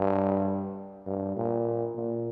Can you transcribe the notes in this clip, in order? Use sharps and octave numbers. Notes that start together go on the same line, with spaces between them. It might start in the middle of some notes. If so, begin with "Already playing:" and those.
Already playing: G2
G2
A#2
A#2